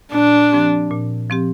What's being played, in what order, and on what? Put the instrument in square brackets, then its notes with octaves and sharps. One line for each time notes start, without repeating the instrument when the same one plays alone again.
[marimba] A#2 [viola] D4
[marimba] F3 C4 G4
A#2
F3 C4 G4